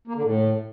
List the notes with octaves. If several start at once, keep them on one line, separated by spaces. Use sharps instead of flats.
A#3
D3
A2